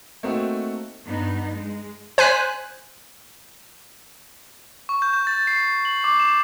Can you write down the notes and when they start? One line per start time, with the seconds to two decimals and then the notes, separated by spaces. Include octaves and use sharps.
0.23 A3 A#3 C4 D#4 F#4
1.06 G2 B3 D#4
1.55 G#3
2.18 C5 G#5 F#6 B6
4.89 C#6
5.02 G6
5.14 G6
5.27 A6
5.47 C7
5.85 F#7
6.04 D6
6.20 E7